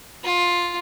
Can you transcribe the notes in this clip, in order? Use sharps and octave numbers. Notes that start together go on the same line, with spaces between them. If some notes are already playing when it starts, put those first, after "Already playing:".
F4